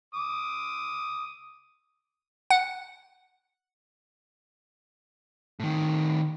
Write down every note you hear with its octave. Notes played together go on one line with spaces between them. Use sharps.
D6 D#6
F#5
A2 D#3